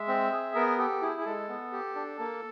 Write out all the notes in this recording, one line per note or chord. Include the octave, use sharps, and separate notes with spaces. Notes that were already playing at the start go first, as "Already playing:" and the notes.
Already playing: G#3 E5
C4
G#4
B3 A#4
G4 A4
E4 G#4
G#4
G#3 A4
B3
G4
D4
A#3